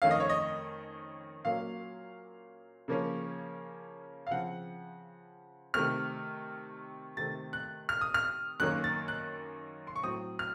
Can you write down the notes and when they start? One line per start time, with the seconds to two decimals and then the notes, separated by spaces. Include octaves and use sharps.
0.02 F2 D#3 A3 C#4 F5
0.11 D#5
0.20 C#5
0.29 D#5
1.45 A#2 F#3 A#3 C#4 F5
2.88 C#3 F3 A#3 C#4
4.27 F5
4.31 C#3 F3 C4 F#5
5.74 C3 D#3 A3 C4 F6
7.17 C3 D#3 A3 C4 A6
7.53 F#6
7.89 F6
8.01 D#6
8.14 F6
8.60 F#2 D#3 A#3 C#4 F#6
8.84 A6
9.08 F#6
9.87 C6
9.96 C#6
10.03 A2 F#3 C4 D#6
10.39 F6